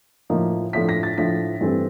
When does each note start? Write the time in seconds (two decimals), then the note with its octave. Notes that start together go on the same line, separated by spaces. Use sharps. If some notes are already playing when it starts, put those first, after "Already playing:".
0.30 A2 F3 A#3 D#4
0.73 A2 F3 A3 D4 B6
0.89 A#6
1.03 A6
1.17 A2 F3 A3 D4 B6
1.61 G2 E3 A3 C4